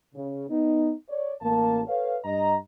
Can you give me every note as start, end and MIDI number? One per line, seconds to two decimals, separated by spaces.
0.15 0.45 49
0.49 0.92 59
0.49 0.92 63
1.09 1.34 73
1.09 1.34 74
1.42 1.81 33
1.42 1.81 58
1.42 1.81 81
1.88 2.17 69
1.88 2.17 71
1.88 2.17 73
1.88 2.17 77
2.25 2.56 43
2.25 2.56 75
2.25 2.56 82